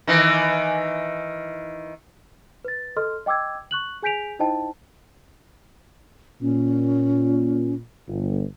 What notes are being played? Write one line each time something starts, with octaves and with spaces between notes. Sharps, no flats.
D#3 E3
B4 A6
A4 D#5 C6 F6
D#5 G5 D6 E6 G#6
C#6 F#6 F#7
G#4 G#5 G6 B6 D7 F7
D#4 E4 C5 D#5 G5 A5
A#2 C#4
G1